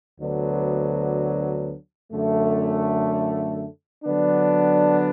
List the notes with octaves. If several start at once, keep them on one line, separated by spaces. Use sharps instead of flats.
D2 D3 F#3 B3 D4
F#2 D3 A3
D3 F#3 B3 D4